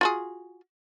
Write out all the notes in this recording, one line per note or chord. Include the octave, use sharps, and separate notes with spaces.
F4 F#4 G#4